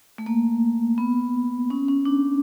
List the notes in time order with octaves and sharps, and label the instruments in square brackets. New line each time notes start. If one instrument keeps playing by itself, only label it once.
[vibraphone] A3
A#3
B3
C#4
C#4
D4